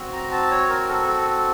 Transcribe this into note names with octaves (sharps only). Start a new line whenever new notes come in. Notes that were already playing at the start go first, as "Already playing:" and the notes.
Already playing: C4 F#4
A#5
A5
C#5
A#4
A4
A4